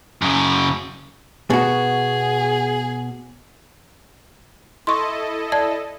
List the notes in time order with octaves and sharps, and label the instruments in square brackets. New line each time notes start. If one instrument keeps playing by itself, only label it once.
[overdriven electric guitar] F#2 C#3
[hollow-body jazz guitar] B2 F#4 [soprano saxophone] G#4
[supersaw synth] E4 A4 D#5 [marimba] C6 C#6
[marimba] D5 A5 G#6